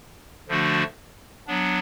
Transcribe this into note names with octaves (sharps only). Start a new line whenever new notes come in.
D3 F3 A3 D4 F#4
F#3 B3 D4